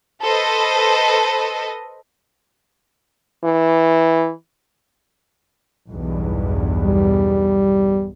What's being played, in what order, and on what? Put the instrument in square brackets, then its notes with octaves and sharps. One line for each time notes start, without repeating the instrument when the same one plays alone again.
[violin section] A4 B4 C5 D#5
[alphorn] E3
[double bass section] B1 E2 G2
[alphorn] G3